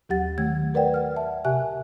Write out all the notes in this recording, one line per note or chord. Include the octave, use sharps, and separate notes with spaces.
D#2 F#3 G4 F#5 A6
D#3 A3 G#6
A#4 B4 D5 F#5 G5
F#5 F6
E5 A5
C3 G4 E5 G#5 F#6